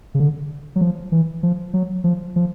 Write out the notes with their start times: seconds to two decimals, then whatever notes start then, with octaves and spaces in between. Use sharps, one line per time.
0.15 C#3
0.20 D3
0.76 F#3
0.81 F3
1.12 E3
1.43 F3
1.74 F#3
2.04 F3
2.36 F3